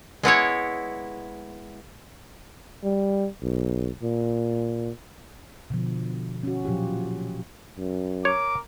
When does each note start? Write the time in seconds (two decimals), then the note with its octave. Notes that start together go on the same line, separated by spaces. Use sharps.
0.23 G#3 B3 E4 C#5
2.84 G3
3.42 B1
4.03 A#2
5.70 B2 D3 F3
6.43 C#4 F#4
6.65 A#2 F3 F#3 F4 G4
7.77 F#2
8.25 A#4 C#5 D6